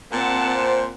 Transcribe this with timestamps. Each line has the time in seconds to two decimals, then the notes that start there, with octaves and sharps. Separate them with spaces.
0.12 A#2 C4 F#5 A5
0.56 C5